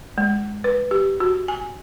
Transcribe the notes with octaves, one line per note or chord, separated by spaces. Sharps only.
G#3
B4
G4
F#4
G#5